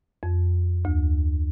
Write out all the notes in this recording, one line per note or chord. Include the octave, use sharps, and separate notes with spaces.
F2
D2